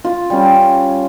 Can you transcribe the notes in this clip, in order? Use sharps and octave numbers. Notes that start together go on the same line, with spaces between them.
F4
G3 C#4